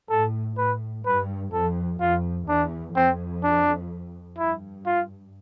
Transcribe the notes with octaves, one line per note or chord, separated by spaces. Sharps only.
A2 A4
A2 B4
G2 B4
F2 A4
F2 F4
E2 D4
F2 C4
D4
G2 E4
F4